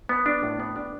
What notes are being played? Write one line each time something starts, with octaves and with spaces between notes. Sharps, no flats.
B3
D4
A2
B3
D4